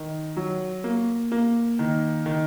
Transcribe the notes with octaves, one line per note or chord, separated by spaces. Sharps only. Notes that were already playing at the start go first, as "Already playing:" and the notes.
Already playing: D#3
F#3
A#3
A#3
D#3
D#3